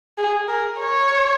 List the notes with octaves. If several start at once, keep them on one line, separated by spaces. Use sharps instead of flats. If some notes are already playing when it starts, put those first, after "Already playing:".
G#4
A#4
C#5